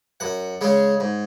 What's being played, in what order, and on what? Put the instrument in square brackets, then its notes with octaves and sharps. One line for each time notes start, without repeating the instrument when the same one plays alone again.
[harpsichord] F#2 F#5
C#3 G#3 C#4
G#2